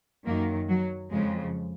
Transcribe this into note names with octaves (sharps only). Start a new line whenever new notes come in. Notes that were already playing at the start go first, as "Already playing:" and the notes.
F#2 D#3 F#3 A#3
F#3
F2 C#3 F3 G#3